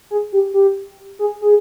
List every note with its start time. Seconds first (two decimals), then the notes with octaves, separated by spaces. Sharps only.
0.11 G#4
0.33 G4
0.54 G4
1.19 G#4
1.41 G#4